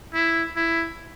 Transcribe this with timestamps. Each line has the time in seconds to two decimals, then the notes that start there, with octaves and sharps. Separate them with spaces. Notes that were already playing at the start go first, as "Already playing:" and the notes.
0.14 E4
0.56 E4